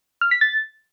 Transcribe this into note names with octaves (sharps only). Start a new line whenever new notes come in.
F6
B6
A6